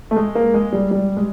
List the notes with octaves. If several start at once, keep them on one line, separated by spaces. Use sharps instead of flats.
A3
G#3
A#3
G#3
G3
G3
G#3